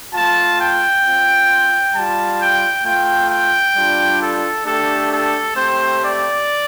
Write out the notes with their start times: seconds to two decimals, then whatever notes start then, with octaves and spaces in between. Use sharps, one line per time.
0.13 A3 F4 A5
0.58 G5
1.04 C4 F4
1.94 G3 F4 A5
2.40 G5
2.84 A3 F4 G5
3.30 G5
3.75 G3 D4 F4
4.20 A4
4.65 A3 D4 G4 A4
5.10 A4
5.55 A3 C4 G4 C5
6.01 D5